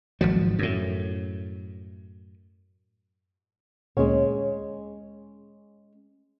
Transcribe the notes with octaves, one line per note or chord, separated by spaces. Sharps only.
G#1 F3 F#3
F#2 A2
D2 A#2 G#3 C#4